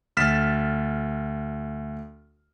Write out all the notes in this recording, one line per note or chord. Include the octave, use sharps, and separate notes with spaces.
D2 F6 A6 B6 E7